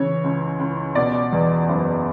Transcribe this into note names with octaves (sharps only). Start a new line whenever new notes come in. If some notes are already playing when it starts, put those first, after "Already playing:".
Already playing: C#3 E3 C#5
C#2
C#2
B2 D5
E2
F#1